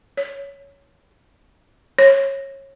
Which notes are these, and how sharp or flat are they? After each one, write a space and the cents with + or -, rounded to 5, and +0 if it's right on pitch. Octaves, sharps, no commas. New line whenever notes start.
C#5 +10
C#5 -25